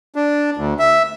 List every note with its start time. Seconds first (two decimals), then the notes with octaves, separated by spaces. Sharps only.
0.15 D4
0.57 D2
0.79 E5